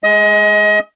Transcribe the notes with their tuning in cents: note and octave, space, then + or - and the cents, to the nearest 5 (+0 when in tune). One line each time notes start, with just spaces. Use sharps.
G#3 +0 D#5 +30